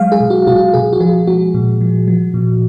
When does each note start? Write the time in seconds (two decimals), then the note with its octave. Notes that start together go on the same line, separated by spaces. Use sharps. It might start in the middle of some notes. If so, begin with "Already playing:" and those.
Already playing: F#3 G#3 F5
0.12 G#4
0.21 B2
0.30 F#4
0.47 B2 F#4
0.74 B2 G#4
0.93 F#4
1.00 F3 G#4
1.27 G#3 F#4
1.54 A#2
1.81 F3
2.08 F3
2.34 A#2